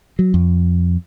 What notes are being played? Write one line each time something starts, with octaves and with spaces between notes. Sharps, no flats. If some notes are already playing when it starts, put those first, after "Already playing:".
F#3
F2